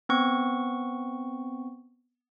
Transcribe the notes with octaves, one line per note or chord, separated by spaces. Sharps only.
B3 C4 C#6